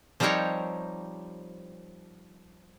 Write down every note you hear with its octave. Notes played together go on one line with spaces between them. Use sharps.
F3 G3 C4 D#4 A#4 C#5